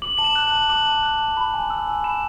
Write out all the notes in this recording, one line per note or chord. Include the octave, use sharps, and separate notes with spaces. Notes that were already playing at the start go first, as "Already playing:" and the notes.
D6 F#7
A5 F#7
E7
F#6
F#7
A5
D6 F#7
A5
F#6
A5
B5
G#5
E6
G#5
B5 E7